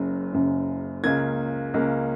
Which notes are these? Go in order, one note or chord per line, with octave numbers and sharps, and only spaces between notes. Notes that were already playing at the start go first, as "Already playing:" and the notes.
Already playing: F#1 F#2 C#3
F#1 F#2 C#3
C#2 C#3 A#3 G#6
C#2 C#3 A#3